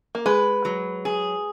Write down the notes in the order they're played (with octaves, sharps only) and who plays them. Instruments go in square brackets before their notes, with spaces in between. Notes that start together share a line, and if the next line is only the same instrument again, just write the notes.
[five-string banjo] A#3
[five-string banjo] G#3 [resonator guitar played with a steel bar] B4
[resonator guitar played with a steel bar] F#3
G#4